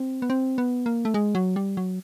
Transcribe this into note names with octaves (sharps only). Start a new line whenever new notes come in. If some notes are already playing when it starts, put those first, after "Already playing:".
Already playing: C4
B3
C4
B3
A#3
A3
G#3
F#3
G3
F#3